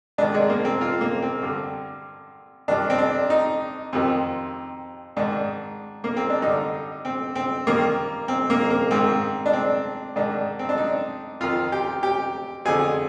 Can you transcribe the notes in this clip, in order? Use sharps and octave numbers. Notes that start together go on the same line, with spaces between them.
G#2 D#3 D4
G#3
A#3
C4
F4
A#3
C4
G2 D3
G2 D#3 D4
C4
D4
D#4
F2 C3 D#3
G#2 D#3 D4
A#3
C4
D4
G2 D3 D#4
C4
C4
G2 D#3 A#3
C4
A#3
A#3
G#2 D#3 C4
D4
C4
G#2 D#3 D4
C4
D4
D#4
F2 D#3 F4
G4
G4
F2 D3 G#4